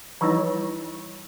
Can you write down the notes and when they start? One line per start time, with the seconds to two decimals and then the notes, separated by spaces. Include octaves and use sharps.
0.21 E3 F3 G3 D#4 E4 C#5